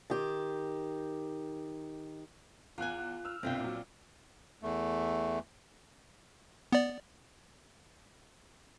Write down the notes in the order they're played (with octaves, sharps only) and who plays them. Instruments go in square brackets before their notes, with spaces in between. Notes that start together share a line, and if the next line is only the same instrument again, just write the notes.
[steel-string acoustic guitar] D#3 G4
[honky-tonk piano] E2 F#6 [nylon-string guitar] F4 G#5
[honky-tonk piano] E6 F6
[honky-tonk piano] G1 C2 [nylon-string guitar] C4 F4 G5
[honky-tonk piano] A#2 F#3
[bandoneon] E2 A3
[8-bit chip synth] B3 D5